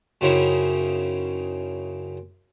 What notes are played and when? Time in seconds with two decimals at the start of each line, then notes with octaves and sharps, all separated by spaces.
0.21 F#2 C#3 C4 D#4 E4